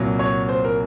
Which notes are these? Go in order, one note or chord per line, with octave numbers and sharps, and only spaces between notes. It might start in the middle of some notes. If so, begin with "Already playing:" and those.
Already playing: C2 A#2 F#3
C#5
C5
A#4